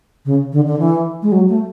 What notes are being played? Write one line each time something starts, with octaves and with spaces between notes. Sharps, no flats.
C#3
D3
D3
E3
G#3
F#3
A3